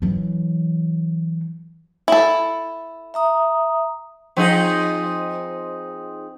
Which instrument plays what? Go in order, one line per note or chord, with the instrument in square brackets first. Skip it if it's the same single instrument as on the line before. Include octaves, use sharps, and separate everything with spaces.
[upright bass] E3 F#3
[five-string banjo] E4 A4
[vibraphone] E5 A#5 D#6
[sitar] F3 D#4 G#4 [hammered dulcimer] C4